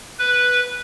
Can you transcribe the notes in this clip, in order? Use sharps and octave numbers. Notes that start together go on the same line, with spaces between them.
B4